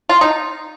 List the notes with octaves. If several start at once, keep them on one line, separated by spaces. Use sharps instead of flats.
F4
D#4